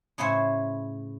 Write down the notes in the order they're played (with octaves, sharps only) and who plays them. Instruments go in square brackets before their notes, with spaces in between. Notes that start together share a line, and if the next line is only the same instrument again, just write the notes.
[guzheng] A2 C#3 E4 C5 C#5